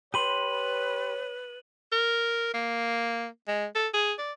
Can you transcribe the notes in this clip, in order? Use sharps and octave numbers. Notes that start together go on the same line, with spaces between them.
G4 B4 C#5 B5 C6 D#7 F#7
A#4
A#3
G#3
A4
G#4
D5